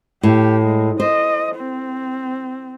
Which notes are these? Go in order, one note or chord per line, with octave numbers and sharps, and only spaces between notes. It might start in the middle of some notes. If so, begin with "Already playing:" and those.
A2 G4
G#3
C5 D#5
C4